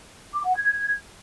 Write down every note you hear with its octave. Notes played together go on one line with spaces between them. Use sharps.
D6
F#5
G#6